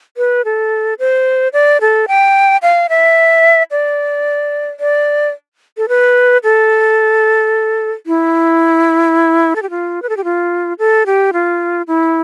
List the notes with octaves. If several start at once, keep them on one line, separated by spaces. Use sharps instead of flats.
B4
A4
C5
D5
A4
G5
F5
E5
D5
D5
A4
B4
A4
E4
A4
G4
F4
B4
A4
G4
F4
A4
G4
F4
E4